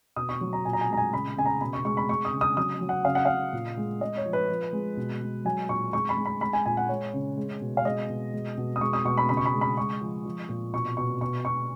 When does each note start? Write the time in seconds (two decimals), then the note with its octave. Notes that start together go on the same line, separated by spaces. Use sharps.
0.16 B2 D#6
0.29 C#6
0.41 F#3
0.53 A#5
0.65 A#2 G#5
0.73 A#5
0.81 G#5
0.89 G#3 A#5
0.97 G#5
1.13 C#3 B5
1.37 C#3 G#5
1.45 A#5
1.61 B2 B5
1.73 C#6
1.84 G#3 C#6
1.97 B5
2.09 G#3 C#6
2.25 D#6
2.33 C#3
2.41 D#6
2.57 F#3 D#6
2.81 F#3
2.89 F#5
3.05 C#3 F5
3.15 F#5
3.25 C#3 F5
3.53 A#2
3.77 G#3
4.01 G#3 D#5
4.17 C#5
4.25 F3
4.33 B4
4.49 F3
4.73 G#3
4.97 B2
5.21 G#3
5.45 F#3 G#5
5.69 A#2 C#6
5.93 G#3 C#6
6.09 B5
6.17 G#3
6.25 B5
6.41 G#3 B5
6.53 G#5
6.66 A#2 G#5
6.77 F#5
6.89 G#3 C#5
7.13 C#3
7.37 G#3
7.62 B2
7.77 F5
7.85 G#3 D#5
8.10 B2
8.34 G#3
8.58 B2
8.76 D#6
8.81 G#3 C#6
8.93 D#6
9.05 B2 C#6
9.17 B5
9.29 C#3 B5
9.37 C#6
9.46 B5
9.53 G#3
9.61 B5
9.77 G#3 C#6
10.01 F3
10.25 F3
10.49 A#2
10.73 B2 C#6
10.97 B2 C#6
11.21 B2 C#6
11.45 B2 C#6